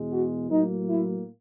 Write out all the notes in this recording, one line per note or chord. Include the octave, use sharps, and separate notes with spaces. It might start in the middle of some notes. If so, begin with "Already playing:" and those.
Already playing: E2 B2 G#3
F#4
A2 F#3 A#3 D#4
E4